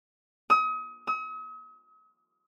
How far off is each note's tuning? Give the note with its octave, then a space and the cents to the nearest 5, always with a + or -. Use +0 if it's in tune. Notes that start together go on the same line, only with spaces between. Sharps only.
D#6 +35
D#6 +45